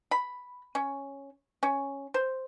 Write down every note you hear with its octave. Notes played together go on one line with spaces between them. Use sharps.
B5
C#4
C#4
C5